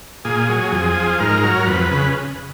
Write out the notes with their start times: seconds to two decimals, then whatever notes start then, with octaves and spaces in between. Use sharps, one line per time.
0.25 A#2 G#4
0.49 F#3
0.72 F2 G#4
0.96 F3
1.20 G#2 A#4
1.44 F#3
1.67 F2 B4
1.91 C#3